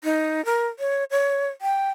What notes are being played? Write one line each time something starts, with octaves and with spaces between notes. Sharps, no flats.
D#4
A#4
C#5
C#5
G5